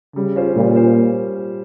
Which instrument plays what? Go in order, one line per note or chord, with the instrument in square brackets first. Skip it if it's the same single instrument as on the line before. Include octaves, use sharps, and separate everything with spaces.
[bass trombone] C#3 [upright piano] G3
[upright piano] C#4 F4 C5
[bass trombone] A#2 [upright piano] G3
[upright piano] F4 C5